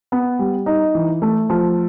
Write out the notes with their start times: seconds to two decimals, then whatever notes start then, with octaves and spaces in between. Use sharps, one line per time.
0.12 B3
0.39 G3
0.66 D#4
0.95 E3
1.22 A3
1.50 F3